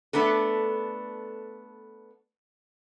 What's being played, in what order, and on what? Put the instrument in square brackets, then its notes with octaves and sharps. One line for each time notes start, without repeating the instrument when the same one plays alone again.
[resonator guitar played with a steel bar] A3 B3 D4 A4